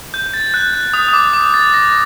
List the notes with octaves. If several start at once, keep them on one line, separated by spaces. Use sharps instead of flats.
G6
A6
F#6
F#6
D#6
D#6
D6
D6
A6
A#6